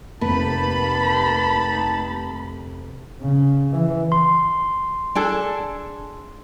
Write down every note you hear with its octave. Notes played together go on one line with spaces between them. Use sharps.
F1 C3 A#3 D#4 G4 B4 A5 B5
C#3
E3
C6
D4 G#4 A4